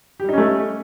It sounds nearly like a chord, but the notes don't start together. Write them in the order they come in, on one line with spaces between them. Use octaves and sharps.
G4 G3 D#4 C#4 A3